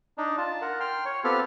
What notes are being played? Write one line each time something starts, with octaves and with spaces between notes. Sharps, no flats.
D4 D#4
F4 A5
A#4 F#5
G5 C6 F6
C#5
B3 C4 F4 G4 A4 F6